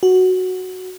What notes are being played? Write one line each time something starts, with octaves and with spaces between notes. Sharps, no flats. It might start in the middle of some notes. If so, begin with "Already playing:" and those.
F#4